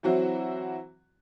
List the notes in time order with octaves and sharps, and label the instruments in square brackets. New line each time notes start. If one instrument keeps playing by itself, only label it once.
[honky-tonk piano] E3 F#3 C4 E4 F#4